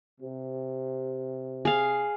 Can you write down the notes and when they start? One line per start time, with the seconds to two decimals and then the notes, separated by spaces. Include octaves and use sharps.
0.21 C3
1.65 G#4 F5